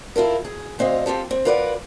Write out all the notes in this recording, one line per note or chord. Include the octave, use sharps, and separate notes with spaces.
E4 F4 A4 A#4
G#4
D2 C4 D#5 F5
C4 F4 G4 A4
C4
F4 A#4 B4 D5 D#5 F#5